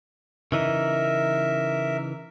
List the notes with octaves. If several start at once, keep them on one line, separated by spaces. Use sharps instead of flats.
C#3 E3 D#4 A#4 E5